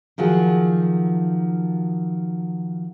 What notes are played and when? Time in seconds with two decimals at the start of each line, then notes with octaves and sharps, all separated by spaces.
0.18 D#3 F3 F#3 F#4 G#4